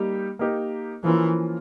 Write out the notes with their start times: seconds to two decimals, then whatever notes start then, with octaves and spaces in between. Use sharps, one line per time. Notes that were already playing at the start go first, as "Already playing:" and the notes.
Already playing: G3 A#3 D#4 G4
0.39 A#3 D#4 G4 A#4
1.04 E3 F3 A#3 C#4 F4 A#4